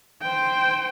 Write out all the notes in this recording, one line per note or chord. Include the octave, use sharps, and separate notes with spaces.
C5 G5